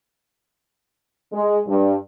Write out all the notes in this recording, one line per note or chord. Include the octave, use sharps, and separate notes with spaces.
G#3
G2